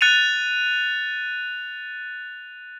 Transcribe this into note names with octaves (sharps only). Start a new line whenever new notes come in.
F#6 A6 C#7 D#7 F7